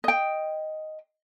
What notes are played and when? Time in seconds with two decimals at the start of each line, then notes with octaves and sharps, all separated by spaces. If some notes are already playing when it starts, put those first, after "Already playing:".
0.04 D#5 G5